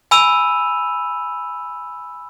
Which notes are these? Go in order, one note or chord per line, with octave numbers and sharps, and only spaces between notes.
G#5 B5 E6 D#7 F7